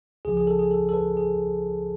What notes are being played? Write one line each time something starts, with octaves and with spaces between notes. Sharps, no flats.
C#2 C#3 F3 G#4
G#4
A4
G#4
A4
A4
B4
G#4